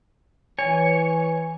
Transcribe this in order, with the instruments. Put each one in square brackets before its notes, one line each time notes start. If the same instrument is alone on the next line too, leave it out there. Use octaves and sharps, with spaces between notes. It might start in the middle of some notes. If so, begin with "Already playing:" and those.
[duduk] E3 [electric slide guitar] C#5 [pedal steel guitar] G#5